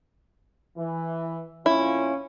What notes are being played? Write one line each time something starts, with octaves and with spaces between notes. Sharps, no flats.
E3
F2 A#2 C#4 E4 F4